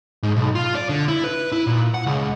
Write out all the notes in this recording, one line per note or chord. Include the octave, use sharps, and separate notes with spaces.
G#2
B1
F4
D5
D3
E4
B4
E4
A#2
F#5
C#2